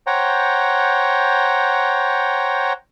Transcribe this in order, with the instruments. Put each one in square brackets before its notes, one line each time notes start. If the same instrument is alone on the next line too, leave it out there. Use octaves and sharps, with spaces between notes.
[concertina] C5 C#5 F#5 G5 A#5